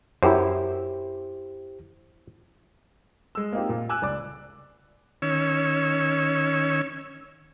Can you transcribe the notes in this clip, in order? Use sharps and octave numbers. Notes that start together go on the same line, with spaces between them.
F#2 E4 G4 C5
G#3 E6
A#3 C4 D#4 F4 G4
A#2
G#5 D6 E6 F#6
C#2 D5 D6
D#3 C#4 C#5 E6